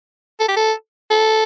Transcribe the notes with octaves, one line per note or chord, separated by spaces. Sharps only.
A4
G4
A4
A4